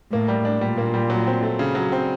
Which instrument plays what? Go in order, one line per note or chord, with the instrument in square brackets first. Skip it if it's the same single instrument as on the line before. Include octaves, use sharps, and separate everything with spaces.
[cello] A2 [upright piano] A#3
[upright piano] G3
D4
[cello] A#2 [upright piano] G3
[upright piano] A#3
G3
F#3
C4
A3
C#3
F#3
C4